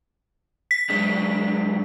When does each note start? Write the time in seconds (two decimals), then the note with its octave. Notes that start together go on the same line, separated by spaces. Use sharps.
0.71 B6
0.90 F#2 G#3 D4